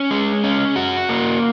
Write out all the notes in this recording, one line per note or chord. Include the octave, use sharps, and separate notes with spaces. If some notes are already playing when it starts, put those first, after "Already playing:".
Already playing: C#4
G#3
C#4
F#4
A#3